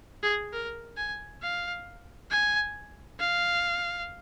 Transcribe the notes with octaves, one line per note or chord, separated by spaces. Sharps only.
G#4
A#4
G#5
F5
G#5
F5